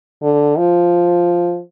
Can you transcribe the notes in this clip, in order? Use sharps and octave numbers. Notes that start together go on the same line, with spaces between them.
D3
F3